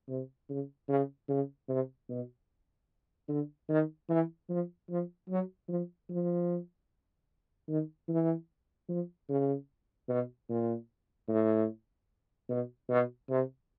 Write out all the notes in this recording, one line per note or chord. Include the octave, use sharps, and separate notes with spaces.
C3
C#3
C#3
C#3
C3
B2
D3
D#3
E3
F3
F3
F#3
F3
F3
D#3
E3
F3
C#3
B2
A#2
A2
B2
B2
C3